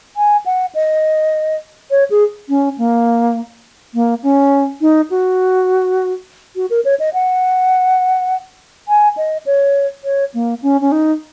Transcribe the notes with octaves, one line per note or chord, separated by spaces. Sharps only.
G#5
F#5
D#5
C#5
G#4
C#4
A#3
A#3
C#4
D#4
F#4
F#4
A#4
C#5
D#5
F#5
G#5
D#5
C#5
C#5
A#3
C#4
C#4
D#4